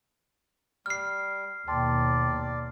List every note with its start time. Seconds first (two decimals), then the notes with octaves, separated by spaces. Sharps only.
0.86 G3 F6 C7
1.67 D#2 B2 D5 G5 A5 C6